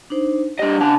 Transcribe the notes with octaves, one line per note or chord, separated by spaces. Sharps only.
D4 D#4 C5
G2 D4 G4 D#5
C#3 D4 A5